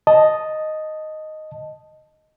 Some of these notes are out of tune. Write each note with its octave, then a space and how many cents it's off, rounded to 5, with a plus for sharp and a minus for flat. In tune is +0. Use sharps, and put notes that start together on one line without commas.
D#5 +0 A5 +0